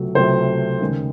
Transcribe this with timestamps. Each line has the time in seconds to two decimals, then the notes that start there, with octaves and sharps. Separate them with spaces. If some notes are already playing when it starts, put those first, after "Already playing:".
Already playing: C#2 C3 F#3 A3
0.15 C#2 C3 F#3 A3 C5
0.81 D#2 C#3 G#3